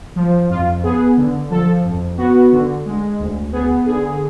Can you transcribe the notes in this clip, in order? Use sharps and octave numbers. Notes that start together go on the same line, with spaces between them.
F3
F2 F4
B3 G#4
D3
F3 A4
F2
B3 F#4
D3
G#3
D2
B3 G#4
D3 G#4